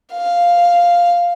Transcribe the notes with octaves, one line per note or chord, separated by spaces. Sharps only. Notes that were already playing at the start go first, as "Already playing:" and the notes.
F5